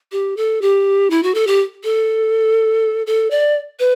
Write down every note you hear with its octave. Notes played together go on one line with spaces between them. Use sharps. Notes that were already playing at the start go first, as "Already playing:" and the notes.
G4
A4
G4
E4
F#4
A4
G4
A4
A4
D5
B4